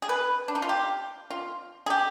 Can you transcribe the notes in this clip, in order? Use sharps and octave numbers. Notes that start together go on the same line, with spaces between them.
G#4
B4
D4
D#4
F4
G4
F4
G#4
G4